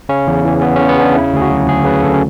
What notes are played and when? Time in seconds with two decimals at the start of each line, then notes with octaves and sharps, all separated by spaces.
0.09 C#3 C#4
0.27 E2
0.45 E3
0.62 E2 B3
0.76 C#4
0.80 C#3
0.89 B3
0.98 E2 D4
1.15 C#3 E4
1.33 D2 G#4
1.42 F#4
1.50 F#3
1.68 D2 G#4
1.85 C#3 B4
2.03 D2 A4
2.14 C#4